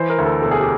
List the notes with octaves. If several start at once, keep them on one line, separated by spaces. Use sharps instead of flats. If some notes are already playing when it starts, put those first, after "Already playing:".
Already playing: E3 C5
A#4
D2
A4
E1 A4
G#4
G4